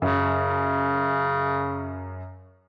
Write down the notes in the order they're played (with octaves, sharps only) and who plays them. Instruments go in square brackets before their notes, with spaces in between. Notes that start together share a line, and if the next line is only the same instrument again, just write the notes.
[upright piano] F#2 [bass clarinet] C#3